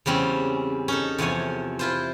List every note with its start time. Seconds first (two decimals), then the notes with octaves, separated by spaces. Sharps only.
0.06 E2 C#3 G3 C4 C#4
0.88 C#4 D#4 A4
1.18 E2 C3 F3 C#5 G#5
1.79 E4 F4 C5